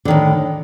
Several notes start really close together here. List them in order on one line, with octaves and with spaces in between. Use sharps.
D3 D#3 A2